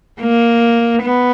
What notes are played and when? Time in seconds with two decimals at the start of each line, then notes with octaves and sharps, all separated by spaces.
0.21 A#3
1.02 B3